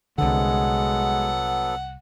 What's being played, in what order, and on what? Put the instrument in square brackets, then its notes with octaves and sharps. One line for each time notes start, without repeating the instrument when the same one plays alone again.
[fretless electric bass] C2 D3 [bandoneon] F#3 B3 A4 [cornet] G#3 [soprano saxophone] F#5